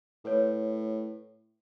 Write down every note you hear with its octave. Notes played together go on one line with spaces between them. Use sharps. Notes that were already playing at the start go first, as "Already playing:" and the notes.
A2 B4 C#5